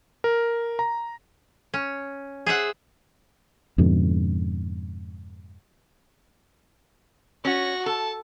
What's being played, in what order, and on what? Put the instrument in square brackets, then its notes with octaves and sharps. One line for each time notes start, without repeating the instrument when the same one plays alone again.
[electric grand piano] A#4
A#5
[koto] C#4
G#4 C5 E5 F#5
[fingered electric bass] F2 G#2 B2 D3
[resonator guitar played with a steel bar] C#4 [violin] F#4 A#6
[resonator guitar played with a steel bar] A4 [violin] A5